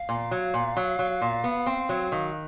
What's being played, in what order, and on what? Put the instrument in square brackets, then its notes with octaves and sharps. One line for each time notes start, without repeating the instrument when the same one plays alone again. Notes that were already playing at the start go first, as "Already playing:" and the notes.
Already playing: [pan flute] F5
[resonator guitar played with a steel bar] A#2
F#3
A#2
F#3
F#3
A#2
B3
C4
F#3
D#3